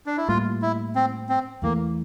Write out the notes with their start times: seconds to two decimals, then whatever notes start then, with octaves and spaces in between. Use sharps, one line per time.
0.06 D4
0.18 E4
0.28 A2 G3 A#3 F4
0.62 E4
0.96 C4
1.29 C4
1.62 E2 E3 A3 A#3